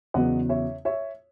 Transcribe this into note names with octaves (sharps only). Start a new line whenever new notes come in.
E2 C#3 F#3 B3 D#5 F#5
C#5 E5
C#5 E5